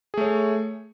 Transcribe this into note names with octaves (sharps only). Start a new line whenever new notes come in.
A3 G#4 C#5